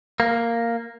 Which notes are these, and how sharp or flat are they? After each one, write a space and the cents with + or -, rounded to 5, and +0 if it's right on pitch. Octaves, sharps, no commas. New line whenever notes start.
A#3 -5